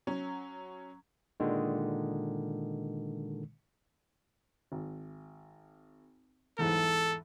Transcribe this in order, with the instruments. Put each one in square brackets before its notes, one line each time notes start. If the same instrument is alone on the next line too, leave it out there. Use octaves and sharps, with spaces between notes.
[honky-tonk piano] F#3 C#4
[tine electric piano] A#2 D3 D#3 G#3
[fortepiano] G#1
[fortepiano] E2 G#2 E3 [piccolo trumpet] A4